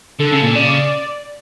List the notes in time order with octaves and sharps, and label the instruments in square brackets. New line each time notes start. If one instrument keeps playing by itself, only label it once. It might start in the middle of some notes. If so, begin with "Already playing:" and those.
[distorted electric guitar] D3 [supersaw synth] A4
[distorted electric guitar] C#3
A#2
[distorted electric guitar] C#3 [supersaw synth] D5